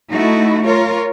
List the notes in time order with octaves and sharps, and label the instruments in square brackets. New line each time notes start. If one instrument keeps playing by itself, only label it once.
[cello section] A3 D#4 E4 F#4
F4 A#4 C#5